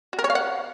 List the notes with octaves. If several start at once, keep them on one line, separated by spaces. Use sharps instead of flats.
F#4
A#4
C#5
F5
F#5